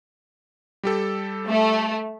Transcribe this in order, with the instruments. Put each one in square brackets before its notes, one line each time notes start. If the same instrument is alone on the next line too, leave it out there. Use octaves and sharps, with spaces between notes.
[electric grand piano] G3 G4 A4
[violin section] A3